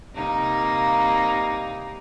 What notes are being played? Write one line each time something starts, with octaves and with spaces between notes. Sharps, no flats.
C3 G3 A#3 D#4